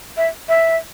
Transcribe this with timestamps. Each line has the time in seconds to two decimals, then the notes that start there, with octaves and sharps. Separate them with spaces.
0.17 E5
0.49 E5